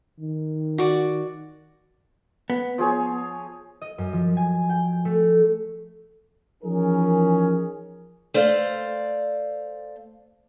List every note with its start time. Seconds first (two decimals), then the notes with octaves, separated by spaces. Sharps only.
0.20 D#3
0.78 F#4 D5
2.50 B3
2.78 F3 G#4 C#5
3.82 D#5
3.98 F#2
4.13 F3
4.37 G#5
4.69 G5
5.05 A3
6.64 E3 F3 C#4 D#4 G#4 A#4
8.34 A3 C5 D5 F5